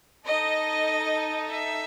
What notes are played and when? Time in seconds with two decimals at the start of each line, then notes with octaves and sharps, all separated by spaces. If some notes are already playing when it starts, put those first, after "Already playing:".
0.25 D#4 A4 D#5
1.47 E5